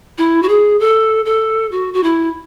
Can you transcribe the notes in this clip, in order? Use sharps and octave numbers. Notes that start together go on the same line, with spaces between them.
E4
F#4
G#4
A4
A4
F#4
F#4
E4